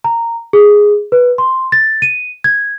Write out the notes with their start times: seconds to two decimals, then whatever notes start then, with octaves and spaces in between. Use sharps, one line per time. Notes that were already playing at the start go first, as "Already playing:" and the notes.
0.04 A#5
0.53 G#4
1.12 B4
1.38 C6
1.72 A6
2.02 D#7
2.44 G#6